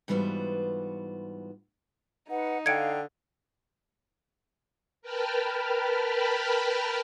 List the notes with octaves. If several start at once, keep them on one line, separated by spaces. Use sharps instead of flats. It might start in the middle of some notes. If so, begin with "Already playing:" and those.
G#2 E3 G3 B3 F4 F#4
D#4 B4 F#5
D3 F5 G5 G#6 C#7 D7
A#4 B4 G5 A5 B5 F6